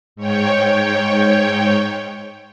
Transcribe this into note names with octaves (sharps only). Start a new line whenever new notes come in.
G#2 C#5 G5